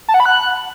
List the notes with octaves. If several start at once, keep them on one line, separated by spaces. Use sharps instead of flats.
A5
F#5
B5
F#6